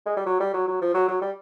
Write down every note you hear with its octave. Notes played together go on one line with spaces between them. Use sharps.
G#3
G3
F#3
G3
F#3
F#3
F3
F#3
F#3
G3